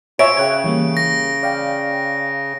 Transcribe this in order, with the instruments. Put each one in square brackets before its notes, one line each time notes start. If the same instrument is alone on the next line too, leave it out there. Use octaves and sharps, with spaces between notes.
[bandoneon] F4 [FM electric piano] C5 G#5 [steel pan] C#5 E5 [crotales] D7
[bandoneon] C#3 [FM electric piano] G5 F#6 G#6
[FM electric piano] E3 G3 A#3
[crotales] A#6
[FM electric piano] D5 F5 G5